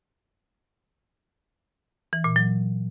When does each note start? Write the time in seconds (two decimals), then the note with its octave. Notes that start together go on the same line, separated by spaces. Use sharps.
2.13 E3
2.24 A#2
2.36 F#3